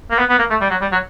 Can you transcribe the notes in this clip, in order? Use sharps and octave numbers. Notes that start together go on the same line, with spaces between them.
A#3
B3
B3
A#3
A3
G3
F#3
G3
F#3